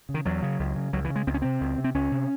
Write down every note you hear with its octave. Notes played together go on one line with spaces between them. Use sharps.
C#3
D#3
E2 F#3
C#3
C#2
C#3
C#2 F#3
E3
C#3
G#3
C#2 C4
C#4
C3 C4
C#2
C3
C4
C#2 C#4
C3